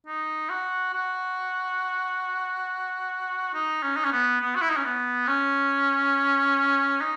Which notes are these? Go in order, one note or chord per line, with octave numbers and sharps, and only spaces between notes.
D#4
F#4
F#4
D#4
C#4
D#4
C#4
B3
B3
F#4
E4
D#4
C#4
B3
C#4
D#4